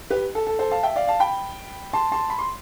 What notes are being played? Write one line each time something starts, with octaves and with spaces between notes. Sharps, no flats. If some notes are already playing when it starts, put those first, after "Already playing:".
G4 B4
A4
A4
A4 C5
F5 A5
E5 G5
D5 F5
F5 A5
G5 B5
A5 C6
A5 C6
B5
C6